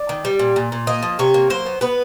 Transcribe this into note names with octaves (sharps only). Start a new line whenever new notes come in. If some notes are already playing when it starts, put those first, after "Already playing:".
Already playing: D5
D#3
G3
A#2
A#2
A#2
A#3 D#5
F3
C3 C#5
A#3
F#3 C5
B3
B3 B4